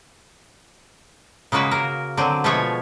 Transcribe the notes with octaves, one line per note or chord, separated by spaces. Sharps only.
C#3 G#3 A#3 F#4 B4
A#3 A#4
D3 F#3 C4
B2 F3 G#3 A3 C#5 E5